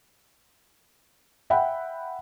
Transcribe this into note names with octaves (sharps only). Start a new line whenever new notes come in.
E5 F#5 G5 B5